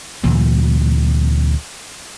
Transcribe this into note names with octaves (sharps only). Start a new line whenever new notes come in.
D2 A#2 E3 F#3